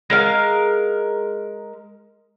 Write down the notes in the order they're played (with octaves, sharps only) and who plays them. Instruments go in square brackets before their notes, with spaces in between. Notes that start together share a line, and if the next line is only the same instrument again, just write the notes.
[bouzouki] G#3 A#4 F5